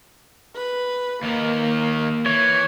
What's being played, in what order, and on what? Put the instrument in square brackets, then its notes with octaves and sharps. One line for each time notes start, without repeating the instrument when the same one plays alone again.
[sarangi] B4
[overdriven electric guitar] D#2 D#3 [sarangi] A#3
[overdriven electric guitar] E3 [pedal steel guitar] C#5